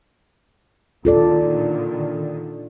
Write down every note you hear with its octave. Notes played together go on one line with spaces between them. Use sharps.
A#2 D3 D#3 F4 A4 D5